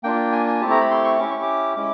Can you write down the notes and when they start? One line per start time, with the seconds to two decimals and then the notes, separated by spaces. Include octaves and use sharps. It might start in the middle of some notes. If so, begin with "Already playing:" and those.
0.04 A#3 D4 F4 G5
0.32 G#5
0.47 G#5
0.61 A3 C4 E4 G4 A5
0.71 A#5
0.81 B5
0.91 C6
1.04 C#6
1.19 C#4 E4 G4 D6
1.31 C#6
1.42 D6
1.76 G#3 C#4 E4 D6